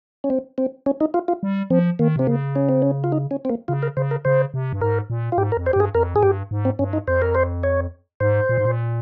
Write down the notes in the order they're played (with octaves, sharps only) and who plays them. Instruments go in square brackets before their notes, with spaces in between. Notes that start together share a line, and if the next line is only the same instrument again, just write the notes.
[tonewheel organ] C#4
C4
C4
C#4
D#4
F4
F4
[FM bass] G3
[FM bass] F3 [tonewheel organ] C4
[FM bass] D#3 [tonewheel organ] A#3
[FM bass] C3 [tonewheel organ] C4
[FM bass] C#3 [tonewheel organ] A#3
[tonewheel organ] C#4
C4
C#4
F4
D#4
C#4
C4
A#3
[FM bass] C#3 [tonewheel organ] F4
[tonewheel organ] A#4
[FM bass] C#3 [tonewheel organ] C5
[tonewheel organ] A#4
[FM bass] C#3 [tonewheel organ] C5
[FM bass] C3
G2
[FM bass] G#2 [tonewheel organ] A#4
[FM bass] A#2
[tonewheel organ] F4
[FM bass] G#2 [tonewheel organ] G4
[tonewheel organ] A#4
[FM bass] F2
[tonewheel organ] C5
G4
[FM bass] G2 [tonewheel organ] G#4
[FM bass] F2 [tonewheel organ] A#4
[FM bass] G#2 [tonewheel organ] G#4
[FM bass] G2 [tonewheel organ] G4
[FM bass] G#2
[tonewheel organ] C4
[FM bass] G2 [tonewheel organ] C#4
[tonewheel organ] D#4
[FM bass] F2 [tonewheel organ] C5
[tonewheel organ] A#4
C5
C#5
[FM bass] G#2 [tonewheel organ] C5
[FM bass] A#2
G#2
A#2